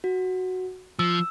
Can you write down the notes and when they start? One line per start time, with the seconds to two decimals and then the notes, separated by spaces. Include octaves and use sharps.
0.04 F#4
0.99 F3 E6